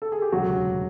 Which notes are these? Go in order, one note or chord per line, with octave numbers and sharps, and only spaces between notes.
A4
G#4
G4
E1 D2 C#3 F#3 F#4